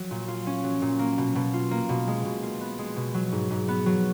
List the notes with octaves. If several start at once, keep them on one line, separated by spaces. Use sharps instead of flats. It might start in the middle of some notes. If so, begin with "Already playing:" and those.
Already playing: F#3
A#2
F4
C#4
F#3
A#2
A#3
B2
B2
F4
A#3
B2
G#3
B2
F4
B3
G#3
B2
F#3
G#2
G#2
B3
F#3